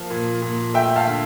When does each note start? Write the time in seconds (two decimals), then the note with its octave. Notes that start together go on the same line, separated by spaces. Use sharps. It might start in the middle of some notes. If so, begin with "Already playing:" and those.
Already playing: F3 A#3 F5 A5
0.10 A#2
0.42 A#2
0.74 A3 E5 G5
0.96 F5 A5
1.07 D3